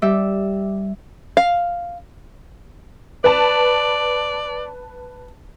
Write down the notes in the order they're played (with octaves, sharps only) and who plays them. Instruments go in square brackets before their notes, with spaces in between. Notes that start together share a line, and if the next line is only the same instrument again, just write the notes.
[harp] G3 G4 E5
[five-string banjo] F5
[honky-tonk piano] B4 A5 [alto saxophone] D5